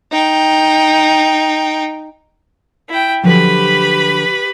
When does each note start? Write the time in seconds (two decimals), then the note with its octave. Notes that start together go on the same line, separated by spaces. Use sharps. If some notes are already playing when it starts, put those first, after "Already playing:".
0.12 D#4 G5
2.89 E4 G5
3.23 D3 F3 F#3 G4 B4 B5